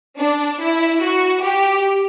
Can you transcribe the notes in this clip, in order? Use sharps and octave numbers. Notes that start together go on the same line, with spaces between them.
D4
E4
F#4
G4